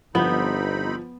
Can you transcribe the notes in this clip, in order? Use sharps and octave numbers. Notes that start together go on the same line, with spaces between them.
G1 F3 B3 C4 D#4 B5